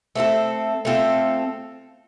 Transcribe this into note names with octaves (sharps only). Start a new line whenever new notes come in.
A3 C4 F4 A4
A3 C4 F4 A4